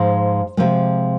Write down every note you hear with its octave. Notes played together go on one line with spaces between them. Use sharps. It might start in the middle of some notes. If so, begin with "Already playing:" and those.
Already playing: G#2 F3 G#3 C5
C3 F3 G#3